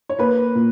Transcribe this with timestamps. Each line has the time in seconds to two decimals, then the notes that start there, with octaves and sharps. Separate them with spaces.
0.09 C#5
0.19 A#3 B4
0.55 A#2